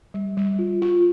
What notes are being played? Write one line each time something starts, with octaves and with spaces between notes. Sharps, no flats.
G3
G3
F4
F4